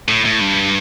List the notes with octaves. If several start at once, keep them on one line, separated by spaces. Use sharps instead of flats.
A2
A2
G2